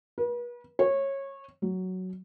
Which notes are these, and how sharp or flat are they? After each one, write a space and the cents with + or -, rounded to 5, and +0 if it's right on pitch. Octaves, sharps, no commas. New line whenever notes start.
B4 -40
C#5 -20
F#3 +5